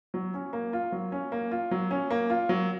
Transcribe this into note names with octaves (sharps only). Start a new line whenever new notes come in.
F#3
C#4
A#3
F4
F#3
C#4
A#3
F4
F#3
C#4
A#3
F4
F#3